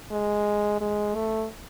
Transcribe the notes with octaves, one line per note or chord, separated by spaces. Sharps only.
G#3
G#3
A3